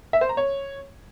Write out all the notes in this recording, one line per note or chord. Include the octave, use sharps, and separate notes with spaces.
E5
C5
A#5
C#5